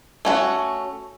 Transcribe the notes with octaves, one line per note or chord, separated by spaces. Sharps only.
A3 C#4 F#4